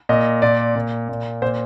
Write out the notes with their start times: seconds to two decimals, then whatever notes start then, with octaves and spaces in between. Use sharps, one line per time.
0.09 A#2 D#5
0.42 A#2 D5
0.76 A#2
1.09 A#2
1.42 A#2 C5